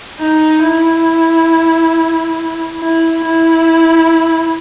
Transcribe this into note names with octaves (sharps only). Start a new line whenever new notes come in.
D#4
E4
E4
E4